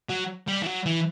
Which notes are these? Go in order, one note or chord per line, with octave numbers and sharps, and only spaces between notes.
F#3
G3
E3
F#3
E3